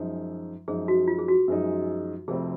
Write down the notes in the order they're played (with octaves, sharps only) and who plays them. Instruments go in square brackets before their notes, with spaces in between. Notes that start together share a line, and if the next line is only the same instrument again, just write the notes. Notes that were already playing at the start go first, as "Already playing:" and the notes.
Already playing: [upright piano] F#2 F3 G#3 D#4
[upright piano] F#2 F3 G#3 D#4 [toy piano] G#4
[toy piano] F#4
F4
G#4
F#4
[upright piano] F#2 F3 G#3 D#4
[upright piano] F1 F2 C3 F3 C4 [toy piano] G#4